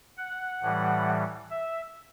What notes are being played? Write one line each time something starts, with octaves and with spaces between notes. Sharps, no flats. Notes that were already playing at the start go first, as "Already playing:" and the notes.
F#5
A2 E3 G3
E5